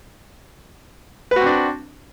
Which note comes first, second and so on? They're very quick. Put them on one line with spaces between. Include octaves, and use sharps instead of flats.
B4 F#4 C4 D4